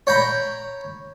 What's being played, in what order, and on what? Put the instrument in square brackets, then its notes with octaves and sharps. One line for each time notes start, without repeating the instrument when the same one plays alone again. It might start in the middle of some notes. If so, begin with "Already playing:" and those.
[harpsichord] C#5 G5 A#5 B5